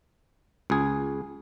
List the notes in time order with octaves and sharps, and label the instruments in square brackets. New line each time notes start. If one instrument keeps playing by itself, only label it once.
[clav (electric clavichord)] C#2 G#4